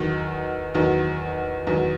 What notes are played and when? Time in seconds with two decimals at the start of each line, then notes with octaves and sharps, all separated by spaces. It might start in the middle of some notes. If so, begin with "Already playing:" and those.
Already playing: E2 D#3 F#3
0.74 E2 D#3 F#3
1.67 E2 D#3 F#3